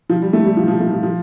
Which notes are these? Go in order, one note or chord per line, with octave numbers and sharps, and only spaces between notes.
F3
G3
A3
G3
F3
F3
A3
F3
F3